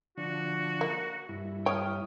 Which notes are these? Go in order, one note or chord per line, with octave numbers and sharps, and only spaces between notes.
D3 F3 D4 F#4
A#3
G2 E4
C#5 G5 D#6 F6